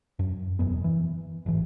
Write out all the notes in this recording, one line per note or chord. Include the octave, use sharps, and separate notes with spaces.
F#2
E1 F#2 B3
E3
A1 G#2 E3